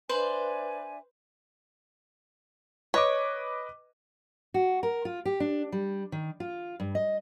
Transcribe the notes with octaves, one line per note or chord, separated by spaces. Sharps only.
D4 B4 C5 E5 G#5
B4 C#5 D#5 D6
F#4
A#4
F4
G4
D4
G3
D#3
F4
G2
D#5